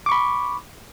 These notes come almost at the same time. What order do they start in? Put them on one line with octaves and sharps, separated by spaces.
D6 C#6 B5